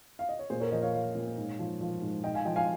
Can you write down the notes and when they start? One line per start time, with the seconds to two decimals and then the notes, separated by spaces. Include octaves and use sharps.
0.19 F5
0.29 D#5
0.39 C#5
0.50 A#2 G#4 C5
0.60 A#4 C#5
0.71 F3 C5 D#5
0.82 C#5 F5
0.94 F3 C#5 F5
1.15 A#2
1.37 G#2
1.59 F3
1.81 F3
2.02 G#2
2.24 G#2 D#5 G5
2.34 F5 G#5
2.45 F3 D#5 G5
2.56 F5 G#5